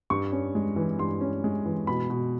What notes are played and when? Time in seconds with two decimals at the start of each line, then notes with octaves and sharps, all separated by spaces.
0.10 G2 C#6
0.32 C#4
0.55 G#3
0.76 E3
0.99 G2 C6
1.21 C#4
1.44 G#3
1.66 E3
1.87 B2 B5
2.10 B2